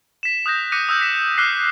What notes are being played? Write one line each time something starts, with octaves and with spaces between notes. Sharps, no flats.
B6 E7
D#6 F#6 G6 A#6
D6 F#6 A#6 B6 C#7 D#7
D#6 E6 G6
B6 E7
D6 F6 F#6 B6 C7